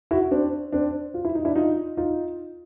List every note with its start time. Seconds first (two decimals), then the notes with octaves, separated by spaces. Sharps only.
0.11 E4 F#4
0.31 C4 D4
0.72 C4 D4
1.14 F4
1.25 E4
1.35 D#4
1.45 D4 E4
1.56 D#4 F4
1.97 D#4 F4